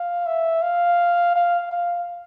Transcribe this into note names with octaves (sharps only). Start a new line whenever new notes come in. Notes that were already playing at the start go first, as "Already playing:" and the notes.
Already playing: F5
E5
F5
F5
F5